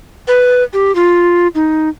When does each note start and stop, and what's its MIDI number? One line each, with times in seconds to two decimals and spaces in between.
0.28 0.63 71
0.73 0.94 67
0.95 1.48 65
1.55 1.89 63